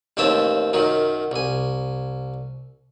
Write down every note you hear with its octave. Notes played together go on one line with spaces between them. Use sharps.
A1 D#2 C4 C#5 E5 A5
F#2 D#3 F#3
C2 G#5